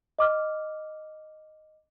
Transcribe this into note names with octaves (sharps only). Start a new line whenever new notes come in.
D#5 D6 F6